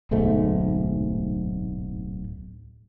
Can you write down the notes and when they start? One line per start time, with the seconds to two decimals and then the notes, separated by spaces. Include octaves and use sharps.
0.11 D1 B1 G#2 A3